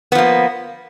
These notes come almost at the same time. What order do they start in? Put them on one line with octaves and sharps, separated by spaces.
B3 F3 A#3